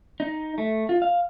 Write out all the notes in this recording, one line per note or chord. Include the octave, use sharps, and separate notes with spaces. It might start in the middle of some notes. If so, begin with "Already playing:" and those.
D#4
A3
F4
F5